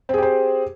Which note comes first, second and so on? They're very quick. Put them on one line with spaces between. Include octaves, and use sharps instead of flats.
C4 G#4 G4 C5